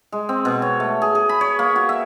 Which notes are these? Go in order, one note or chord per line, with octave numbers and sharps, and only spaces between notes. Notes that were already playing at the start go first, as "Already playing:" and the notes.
G#3
C4
B2
C#5
A3
G#4
G#4
B5
C#5
A#3
F#4
E5